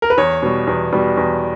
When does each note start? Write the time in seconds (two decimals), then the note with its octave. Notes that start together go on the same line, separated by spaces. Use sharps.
0.02 A#4
0.10 B4
0.18 E2 C#5
0.42 B2 G3
0.67 E2
0.92 B2 G3
1.17 E2